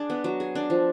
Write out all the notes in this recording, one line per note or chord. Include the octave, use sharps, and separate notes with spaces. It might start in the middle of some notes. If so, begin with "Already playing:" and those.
Already playing: D4 G#4
B3
F#3
G#4
D4
F3